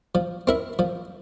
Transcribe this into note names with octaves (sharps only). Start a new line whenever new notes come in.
F3
C4 E4 A#4 E5
F3